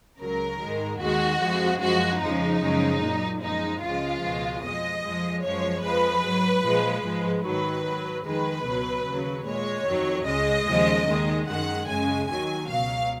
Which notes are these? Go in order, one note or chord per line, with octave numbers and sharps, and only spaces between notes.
C#2 C#3 F#3 A#4
G#2 D#3 G#3
D#2 D#3 G#3 F#4
F2 F3 G#3
F#2 F3 G#3 F#4
F2 C#3 F3 G#3 D#4
F#2 C#3 F3 G#3
A#2 F#3
F#2 F3 G#3 D#4
C#2 C#3 F3 G#3 F4
C#2 B2 G#3
F2 F3 G#3 D#5
F2 F3 G#3
F#2 F3 G#3 C#5
F2 F3 G#3 B4
G#2 F#3
A#2 F3 G#3
G#2 F3 G#3
G#2 D#3 F#3 B4
G#2 F#3
F2 D#3 G#3 B4
C#2 B2 F#3
D#2 C#3 F#3
A#2 G#3 C#5
F2 D#3 F#3
C#2 C#3 G#3 D#5
D#2 C#3 F3 G#3
D#2 D#3 G#3
F#2 D#3 G#3 F#5
F#2 C#3 G#3 G#5
D#2 D#3 F#3 G#5
C#2 B2 F#3 F5